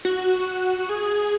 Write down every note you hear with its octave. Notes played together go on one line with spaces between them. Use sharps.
F#4
G#4